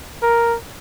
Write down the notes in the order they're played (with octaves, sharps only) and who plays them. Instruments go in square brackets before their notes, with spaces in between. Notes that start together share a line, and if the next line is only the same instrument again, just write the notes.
[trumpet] A#4